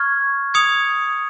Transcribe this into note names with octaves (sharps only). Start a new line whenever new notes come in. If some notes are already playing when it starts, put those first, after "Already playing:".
Already playing: C#6 F6 G#6
D#6 G#6 C#7 F7